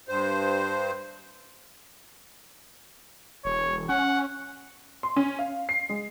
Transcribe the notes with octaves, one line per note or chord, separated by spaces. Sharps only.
G2 C5
E1 C#5
C#4 F#5
C6
C#4
F5
C7
G#3